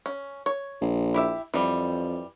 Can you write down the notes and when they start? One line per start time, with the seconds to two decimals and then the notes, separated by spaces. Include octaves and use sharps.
0.06 C#4
0.46 C#5
0.82 A#1
1.14 E4 G4 E5
1.54 F2 E3 G3